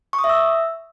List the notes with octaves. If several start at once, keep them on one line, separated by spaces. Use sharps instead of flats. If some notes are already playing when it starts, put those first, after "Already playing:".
C#6
D#6
E5
E6